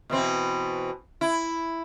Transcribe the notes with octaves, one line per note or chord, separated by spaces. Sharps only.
B2 E3 C4
E4